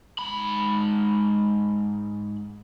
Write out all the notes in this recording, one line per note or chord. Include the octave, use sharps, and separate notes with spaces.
G#2 B5